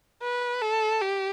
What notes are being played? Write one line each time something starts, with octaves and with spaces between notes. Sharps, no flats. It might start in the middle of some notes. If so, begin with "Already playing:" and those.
B4
A4
G4